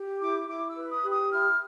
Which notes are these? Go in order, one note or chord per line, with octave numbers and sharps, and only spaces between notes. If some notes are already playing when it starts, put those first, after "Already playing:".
Already playing: G4
E4 D6
E4 D6
E6
B4
D#6
G4
D#6
E4 F6